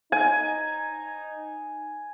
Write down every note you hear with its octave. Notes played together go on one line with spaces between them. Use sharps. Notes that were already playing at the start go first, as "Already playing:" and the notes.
D#4 G#5